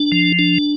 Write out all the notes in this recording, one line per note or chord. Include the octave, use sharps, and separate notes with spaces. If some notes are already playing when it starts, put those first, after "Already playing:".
Already playing: D4
F3
D4